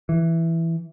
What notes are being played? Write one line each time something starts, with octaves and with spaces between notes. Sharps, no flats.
E3